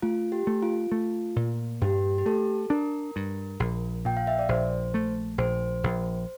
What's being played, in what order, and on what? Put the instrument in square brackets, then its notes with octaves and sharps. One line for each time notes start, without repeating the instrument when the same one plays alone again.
[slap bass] A3 [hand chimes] F4
[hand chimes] G4
[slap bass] A3
[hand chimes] F4
[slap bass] A3
A#2
[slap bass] G2 [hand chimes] G4
[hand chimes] G4
[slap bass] A3 [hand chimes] A4
[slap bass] D4 [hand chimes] A#4
[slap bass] G2
A#1
[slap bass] A#2 [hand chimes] G5
[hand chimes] F5
E5
D5
[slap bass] A#1 [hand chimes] C5
[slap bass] A3
[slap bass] A#1 [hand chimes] C5
[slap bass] A#1